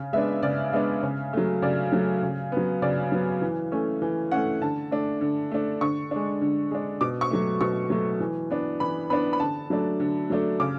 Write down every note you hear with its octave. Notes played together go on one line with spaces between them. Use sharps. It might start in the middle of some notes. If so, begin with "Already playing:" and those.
Already playing: C#3
G#3 B3 D4 E5
C#3 D5
G#3 B3 D4 E5
C#3
F#3 A3
C#3 D5
F#3 A3
C#3
F#3 B3
C#3 D5
F#3 B3
E3
A3 C#4
E3
A3 C#4 F#5
D3 A5
A3 D4
D3
A3 D4
D3 C#6
G#3 D4
D3
G#3 D4
B2 D6
C#6
F#3 A3
B2 C#6
F#3 A3
E3
B3 D4
E3 B5
B3 D4 B5
B5
D3 A5
F#3 A3 D4
D3
F#3 A3 D4
C#3 D6